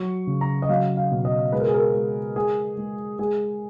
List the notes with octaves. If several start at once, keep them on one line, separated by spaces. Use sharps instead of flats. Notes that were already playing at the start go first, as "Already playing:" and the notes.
Already playing: F#3 C#6
C#3
A#5
D#5
F#3 F5
F5
B2
D#5
G#3 B4
A#4
G#4
A#4
G#3
G#3 G#4
G#3
G#3 G#4